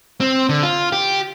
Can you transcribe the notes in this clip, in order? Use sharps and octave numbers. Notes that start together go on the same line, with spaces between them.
C4
D3
F4
G4